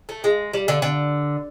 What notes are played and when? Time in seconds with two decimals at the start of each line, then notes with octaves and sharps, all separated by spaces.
0.09 A3
0.24 G#3
0.53 G3
0.68 D3
0.82 D3